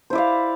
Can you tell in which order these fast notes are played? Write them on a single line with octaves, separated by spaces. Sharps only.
C5 E4 D5 F5